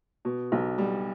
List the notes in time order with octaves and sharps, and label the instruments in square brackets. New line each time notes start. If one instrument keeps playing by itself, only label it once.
[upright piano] B2
B1
G3